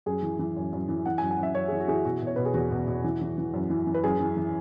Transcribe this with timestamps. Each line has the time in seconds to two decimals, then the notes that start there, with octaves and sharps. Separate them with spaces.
0.06 F#2 G#4
0.23 E3
0.39 E3
0.56 F#2
0.73 F#2
0.89 E3
1.06 E3 F#5
1.18 F#2 G#5
1.31 G#5
1.39 F#2 E5
1.55 F#2 C#5
1.68 G#4
1.72 E3
1.80 F#4
1.88 E3 G#4
1.92 F#4
2.05 B2 F#4
2.22 B2
2.27 C#5
2.36 B2 B4
2.45 G#4
2.54 E2 F#4
2.71 B2
2.88 B2
3.04 E3
3.21 E3
3.38 E3
3.54 F#2
3.70 E3
3.87 E3
3.94 B4
4.03 F#2 G#4
4.20 E3
4.37 E3